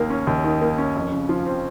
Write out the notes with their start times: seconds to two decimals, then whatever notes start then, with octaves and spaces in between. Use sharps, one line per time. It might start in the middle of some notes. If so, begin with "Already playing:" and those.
Already playing: D#2 D#3 A#3
0.10 C#4
0.27 D#2
0.44 D#3
0.62 A#3
0.78 C#4
0.96 F2
1.12 C#3
1.29 F3
1.46 C4